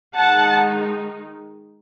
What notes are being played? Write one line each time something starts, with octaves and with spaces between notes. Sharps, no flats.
D#3 G#3 D#4 F#5 A5